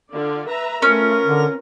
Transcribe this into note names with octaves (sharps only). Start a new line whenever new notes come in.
D3 F4 D5
B4 E5 A#5
A3 C#4 F4 A#4 B4
D3